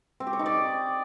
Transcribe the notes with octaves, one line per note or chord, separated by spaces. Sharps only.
C4
G4
C#5
D#4
D5